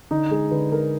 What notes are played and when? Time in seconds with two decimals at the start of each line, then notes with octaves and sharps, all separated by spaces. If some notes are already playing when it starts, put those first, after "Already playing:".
0.11 D3 D#4
0.31 G#3 G#4
0.51 D3 B4
0.72 G#3 A#4